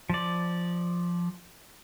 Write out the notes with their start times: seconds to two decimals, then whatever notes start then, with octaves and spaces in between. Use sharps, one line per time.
0.10 F3 D5